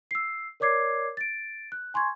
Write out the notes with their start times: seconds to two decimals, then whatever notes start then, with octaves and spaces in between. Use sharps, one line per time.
0.11 E6 C7
0.60 A#4 C#5 D5 D6 G#6 C7
1.17 A6 D7
1.72 F#6
1.94 G#5 C6 C#6 G#6